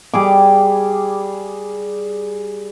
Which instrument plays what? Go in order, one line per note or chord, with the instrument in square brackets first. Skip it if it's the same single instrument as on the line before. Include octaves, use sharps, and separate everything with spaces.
[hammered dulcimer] G3 G#4 D6